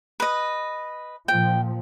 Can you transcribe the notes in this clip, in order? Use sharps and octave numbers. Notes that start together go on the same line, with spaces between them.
B4 D#5
A#2 F3 G5